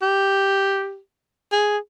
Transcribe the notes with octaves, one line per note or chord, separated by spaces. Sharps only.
G4
G#4